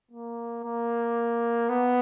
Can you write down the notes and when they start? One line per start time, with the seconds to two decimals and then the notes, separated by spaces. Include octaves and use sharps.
0.11 A#3
0.64 A#3
1.69 B3